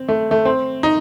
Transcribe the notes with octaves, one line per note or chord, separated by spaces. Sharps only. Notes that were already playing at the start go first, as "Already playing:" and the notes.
Already playing: C4
A3
A3
C4
D#4